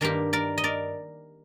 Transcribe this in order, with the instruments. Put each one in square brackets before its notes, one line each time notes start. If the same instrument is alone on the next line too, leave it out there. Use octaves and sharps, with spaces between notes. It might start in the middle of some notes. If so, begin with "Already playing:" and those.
[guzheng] G2 D#3 A#3 D4 G4 A#4
A#4 D5
D#5
A#4 D5